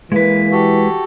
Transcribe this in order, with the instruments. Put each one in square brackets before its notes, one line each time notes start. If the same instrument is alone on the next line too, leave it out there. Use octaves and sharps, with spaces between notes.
[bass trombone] E3 [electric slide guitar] G#3 B4 [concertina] A#3
[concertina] F#4 G4 A4